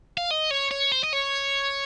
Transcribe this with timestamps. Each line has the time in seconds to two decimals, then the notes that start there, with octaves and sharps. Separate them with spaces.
0.18 F5
0.31 D#5
0.51 C#5
0.71 C#5
0.92 C5
1.04 D#5
1.13 C#5